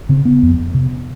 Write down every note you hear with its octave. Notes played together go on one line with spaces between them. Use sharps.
C#3 C4
B3
F2
C3